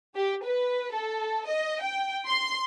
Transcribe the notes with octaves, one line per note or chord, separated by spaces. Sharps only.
G4
B4
A4
D#5
G5
C6